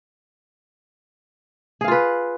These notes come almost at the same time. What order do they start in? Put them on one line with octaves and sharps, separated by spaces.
G#4 F5 F4 B4